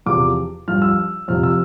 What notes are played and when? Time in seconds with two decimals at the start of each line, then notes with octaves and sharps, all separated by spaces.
0.06 E2 C3 F3 D6
0.68 G2 F3 F6
0.82 E6
1.28 F2 C3 F3 F6
1.43 E6